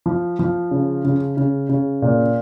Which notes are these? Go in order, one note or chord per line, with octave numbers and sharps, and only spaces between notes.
F3
F3
C#3
C#3
C#3
C#3
A#2